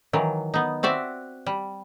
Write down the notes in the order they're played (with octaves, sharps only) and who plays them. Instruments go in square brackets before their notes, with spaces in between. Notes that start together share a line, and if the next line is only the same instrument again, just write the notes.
[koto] D#3 E3 F#3
B3 D#4
C4 F#4 D5 E5
G3